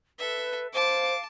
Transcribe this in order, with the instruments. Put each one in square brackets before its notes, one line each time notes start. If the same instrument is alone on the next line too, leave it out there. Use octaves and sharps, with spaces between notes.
[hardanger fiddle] A4 E5 [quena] B4
[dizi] C5 [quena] F5 [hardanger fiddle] A5 [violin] D6